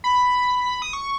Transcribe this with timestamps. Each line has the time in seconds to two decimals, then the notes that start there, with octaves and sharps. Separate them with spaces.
0.04 B5
0.82 D#6
0.93 C#6